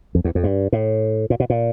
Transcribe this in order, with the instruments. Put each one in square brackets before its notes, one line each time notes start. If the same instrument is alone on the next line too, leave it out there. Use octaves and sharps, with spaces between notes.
[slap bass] F2
E2
F2
G2
A2
A#2
B2
A#2